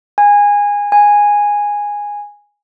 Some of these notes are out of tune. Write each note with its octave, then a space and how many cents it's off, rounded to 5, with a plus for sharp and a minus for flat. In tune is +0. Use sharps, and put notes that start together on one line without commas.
G#5 -20
G#5 -10